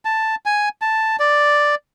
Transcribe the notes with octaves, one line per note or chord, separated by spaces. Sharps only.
A5
G#5
A5
D5